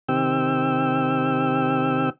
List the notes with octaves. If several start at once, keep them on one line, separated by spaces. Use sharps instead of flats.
C3 D#3 C4 G4 G5 E6